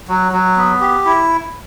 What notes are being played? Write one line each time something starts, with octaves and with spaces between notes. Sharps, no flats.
F#3
F#3
B3
G4
E4